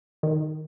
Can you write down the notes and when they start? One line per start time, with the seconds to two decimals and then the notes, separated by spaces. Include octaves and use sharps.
0.23 D#3